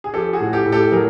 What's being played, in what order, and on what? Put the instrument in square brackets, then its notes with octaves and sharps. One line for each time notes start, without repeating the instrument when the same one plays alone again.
[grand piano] G#4
F3 G4 A4
F#4 G#4
A2
G4 A4
A2
G4 A4
F#3 G#4 A#4